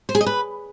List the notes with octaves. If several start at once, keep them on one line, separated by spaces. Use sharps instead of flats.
C5
G#4
D#5
B4